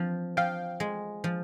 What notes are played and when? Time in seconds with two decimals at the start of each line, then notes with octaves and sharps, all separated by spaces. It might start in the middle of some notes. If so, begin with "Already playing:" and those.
Already playing: F3 C4
0.37 F3 F5 G5
0.80 G#3
1.24 F3